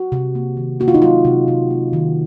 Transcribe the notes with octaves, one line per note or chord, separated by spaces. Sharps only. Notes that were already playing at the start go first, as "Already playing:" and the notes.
Already playing: F#4
C3
A#3
D#3
A#3 F#4
F4
D#4
F#3 F4
C3
C3
A#3
D#3